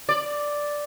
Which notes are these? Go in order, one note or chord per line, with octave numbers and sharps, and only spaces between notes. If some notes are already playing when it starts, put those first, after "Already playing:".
D5